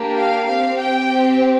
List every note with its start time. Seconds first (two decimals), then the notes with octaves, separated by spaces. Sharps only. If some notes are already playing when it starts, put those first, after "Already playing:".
Already playing: A#3 D4 G4
0.18 F5
0.48 C4 G4 F5
0.79 G5
1.11 C4 G4